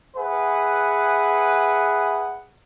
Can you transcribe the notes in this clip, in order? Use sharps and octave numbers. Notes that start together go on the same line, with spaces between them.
G#4 B4 E5 F#5